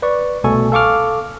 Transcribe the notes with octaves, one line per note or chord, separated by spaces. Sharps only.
B4 D5 C#6
C2 B2 A3 A4 G#5 C#6
A4 F5 C#6 D6 F6